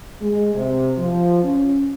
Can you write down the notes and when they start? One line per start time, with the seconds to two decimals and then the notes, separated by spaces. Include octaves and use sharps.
0.21 G#3
0.54 C3
0.98 F3
1.44 C#4